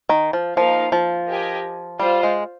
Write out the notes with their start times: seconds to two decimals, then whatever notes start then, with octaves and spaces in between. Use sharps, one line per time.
0.09 D#3
0.33 F3
0.57 F3 A#3 D#4 A#4 F5
0.92 F3
1.28 G4 A#4 D#5 G#5
1.99 G3 F4 C5 F5
2.23 G#3